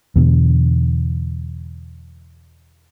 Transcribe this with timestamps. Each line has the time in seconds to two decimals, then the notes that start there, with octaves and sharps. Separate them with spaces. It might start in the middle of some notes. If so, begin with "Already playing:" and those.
0.16 E2 B2 D3